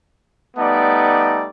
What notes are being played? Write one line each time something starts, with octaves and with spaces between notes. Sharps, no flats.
G3 A3 B3 D#4 D5